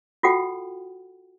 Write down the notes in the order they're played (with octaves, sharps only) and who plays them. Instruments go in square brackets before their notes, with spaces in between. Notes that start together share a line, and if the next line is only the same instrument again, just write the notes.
[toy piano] F4 F#4 A4 F#5 G5